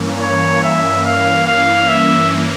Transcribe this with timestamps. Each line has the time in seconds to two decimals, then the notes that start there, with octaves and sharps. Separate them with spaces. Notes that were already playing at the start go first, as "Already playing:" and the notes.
Already playing: G2 E3 A#3 C#4
0.22 C#5
0.64 E5
1.05 F5
1.47 F5
1.88 E5